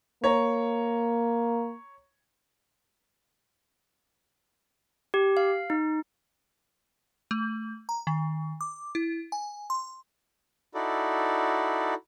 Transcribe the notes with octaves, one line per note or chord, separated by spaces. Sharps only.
A#3 C#5 A#5
G4
F5
D#4
A3
A#5
D#3
D6
E4
G#5
C6
D#4 E4 F#4 A4 D5